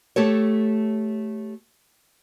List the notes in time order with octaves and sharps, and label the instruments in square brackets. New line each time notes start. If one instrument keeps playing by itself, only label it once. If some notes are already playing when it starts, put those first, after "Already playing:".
[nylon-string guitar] A3 G4 A4 C#5